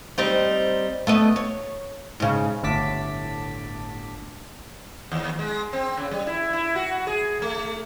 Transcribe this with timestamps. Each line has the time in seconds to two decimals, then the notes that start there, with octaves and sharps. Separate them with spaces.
0.18 G3 C4 D#4
1.07 A3 B3 D#5
1.36 C#5
2.20 G#2 C#3
2.63 G1 A2 D3 A5 D6 B6
5.12 D#2
5.39 G#3
5.73 C4
5.97 C#3
6.11 G3
6.27 E4
6.53 E4
6.76 F#4
7.07 G#4
7.42 A3